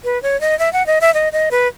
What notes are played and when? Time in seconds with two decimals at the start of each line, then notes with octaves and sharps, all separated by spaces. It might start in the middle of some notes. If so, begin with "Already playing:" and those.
0.04 B4
0.22 C#5
0.41 D#5
0.59 E5
0.73 F#5
0.86 D#5
1.01 E5
1.14 D#5
1.33 D#5
1.51 B4